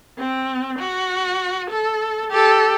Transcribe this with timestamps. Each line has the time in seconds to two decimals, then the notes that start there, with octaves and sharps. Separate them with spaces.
0.18 C4
0.79 F#4
1.70 A4
2.30 G4 A4